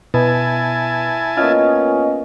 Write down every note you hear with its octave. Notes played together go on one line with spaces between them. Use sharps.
B2 E4 G#5 A5
A#3 B3 C#4 F4 D#5